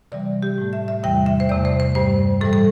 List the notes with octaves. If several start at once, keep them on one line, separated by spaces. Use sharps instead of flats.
C3 E3 G3 D5
G4
A2 A3
E5
E5
E2 C3 E3 G3 G5
E5
C5
E2 C3 A3 D5
C5
C5
G2 G3 C5
A2 E3 G3 A4
A4